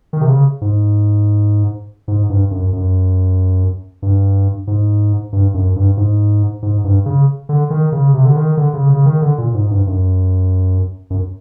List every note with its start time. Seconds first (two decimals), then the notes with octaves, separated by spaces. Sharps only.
0.13 D#3
0.21 C3
0.29 C#3
0.61 G#2
2.08 G#2
2.30 G2
2.51 F#2
2.73 F#2
4.02 G2
4.67 G#2
5.33 G2
5.54 F#2
5.76 G2
5.97 G#2
6.62 G#2
6.84 G2
7.06 C#3
7.49 D3
7.70 D#3
7.92 C#3
8.14 C3
8.25 D3
8.36 D#3
8.57 D3
8.73 C#3
8.90 C#3
9.06 D#3
9.22 D3
9.38 A#2
9.54 G#2
9.71 G2
9.87 F#2
11.10 F#2